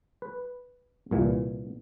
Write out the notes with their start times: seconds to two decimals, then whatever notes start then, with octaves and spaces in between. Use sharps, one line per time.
0.22 B4
1.11 C2 A#2 E3